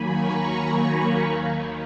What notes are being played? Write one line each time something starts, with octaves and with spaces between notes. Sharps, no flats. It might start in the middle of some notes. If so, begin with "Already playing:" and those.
Already playing: D#2 D#3 F#3 A#3 G#5 B5
A#5 C#6
G#5 B5
D#2 D#3 A#3